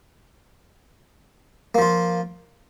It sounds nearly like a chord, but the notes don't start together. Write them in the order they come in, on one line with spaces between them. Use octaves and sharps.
A#3 F3 F4